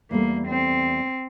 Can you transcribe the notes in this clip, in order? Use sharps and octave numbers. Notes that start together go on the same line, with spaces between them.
E2 G3 A3 A#3
C4